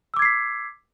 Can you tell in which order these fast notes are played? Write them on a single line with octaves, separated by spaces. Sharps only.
E6 D6 G#6 C7 B6